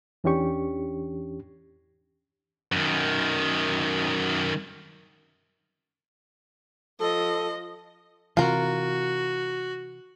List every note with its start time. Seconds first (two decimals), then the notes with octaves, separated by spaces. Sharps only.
0.24 E2 E3 C#4 D4 G4 C#6
2.72 F#2 D#3
7.00 F3 A4 D#5
8.37 C3 E3 F4 F#4 A#4